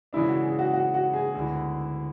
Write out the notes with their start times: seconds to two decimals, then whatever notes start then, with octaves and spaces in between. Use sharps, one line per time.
0.13 C#3 E3 G#3 D4 E4
0.28 F#4
0.43 G#4
0.59 F#4
0.73 F#4
0.94 F#4
1.14 G#4
1.34 D2 D3 G#3 B3 E4